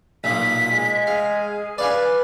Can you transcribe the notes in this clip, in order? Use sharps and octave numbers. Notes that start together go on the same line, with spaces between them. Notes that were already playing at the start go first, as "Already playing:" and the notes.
B1 A#2 B6
G#3
G#4 F5
B4 D5 F5 G#5